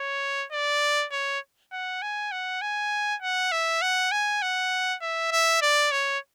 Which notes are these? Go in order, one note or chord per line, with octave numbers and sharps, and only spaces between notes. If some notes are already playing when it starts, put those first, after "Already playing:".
Already playing: C#5
D5
C#5
F#5
G#5
F#5
G#5
F#5
E5
F#5
G#5
F#5
E5
E5
D5
C#5